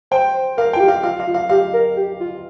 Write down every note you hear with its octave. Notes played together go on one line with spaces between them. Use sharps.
C5 G5
C5
A#4 F5
F4 G5
G4
F5
F4 F5
F5
F4
F5
G4 F5
A#4
G4
F4